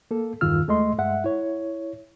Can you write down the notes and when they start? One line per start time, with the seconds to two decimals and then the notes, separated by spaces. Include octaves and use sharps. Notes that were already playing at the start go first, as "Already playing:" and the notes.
0.11 A#3 A4
0.41 E2 G2 D#3 F4 E6 F6
0.67 D#2 G#3 A3 D#5 C6
0.98 G2 G#3 E5 F#5
1.24 E4 C#5